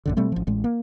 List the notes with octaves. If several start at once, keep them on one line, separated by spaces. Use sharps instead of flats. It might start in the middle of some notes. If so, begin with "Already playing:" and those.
A#1 F#2 D3
B2 G3 A3 C4
A1 F3
A1 A2 G#3
A#3